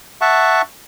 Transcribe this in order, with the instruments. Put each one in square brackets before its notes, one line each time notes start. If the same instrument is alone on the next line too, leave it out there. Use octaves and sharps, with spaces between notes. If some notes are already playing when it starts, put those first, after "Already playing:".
[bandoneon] E5 F#5 A5 C#6